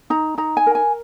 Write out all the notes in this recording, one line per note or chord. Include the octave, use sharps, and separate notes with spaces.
D#4 A#5
D#4 A#5
G#5
A#4
G#5